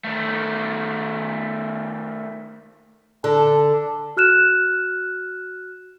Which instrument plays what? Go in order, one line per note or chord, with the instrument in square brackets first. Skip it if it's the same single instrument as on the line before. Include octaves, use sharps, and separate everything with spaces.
[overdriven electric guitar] D#3 A3
[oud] D3 [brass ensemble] A5
[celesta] F#4 F6 F#6 E7